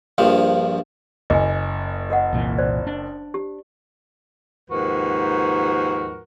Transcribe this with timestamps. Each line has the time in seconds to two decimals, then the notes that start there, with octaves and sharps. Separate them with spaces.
0.18 A#1 G2 F3
1.30 F#1 D#5 G#5
2.10 A#4 D#5 F#5
2.33 C2 A#2 E3
2.58 C5 D5
2.87 D4
3.34 G4
4.70 D#2 G#2 F3 F#4 A#4 B4